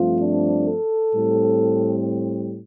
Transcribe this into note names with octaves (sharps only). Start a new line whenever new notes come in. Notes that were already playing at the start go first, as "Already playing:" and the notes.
Already playing: G2 F3 A3 C4 F4
D4
A4
A2 G3 C4